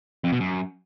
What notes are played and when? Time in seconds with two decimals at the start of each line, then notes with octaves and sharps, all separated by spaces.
0.24 F2
0.32 B2
0.40 F#2